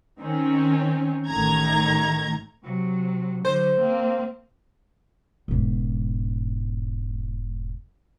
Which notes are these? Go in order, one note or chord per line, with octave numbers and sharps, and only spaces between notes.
D#3 C4 C#4
A1 A2 D#3 A3 A#5 G#6
C3 F#3
D3 F#3 C5
A#3 C4
E1 G#2